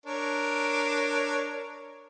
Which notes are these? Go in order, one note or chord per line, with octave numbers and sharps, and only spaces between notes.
D4 A#4 C#5